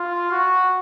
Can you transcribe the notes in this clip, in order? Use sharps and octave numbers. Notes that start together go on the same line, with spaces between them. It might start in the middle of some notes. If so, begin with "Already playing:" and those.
Already playing: F4
F#4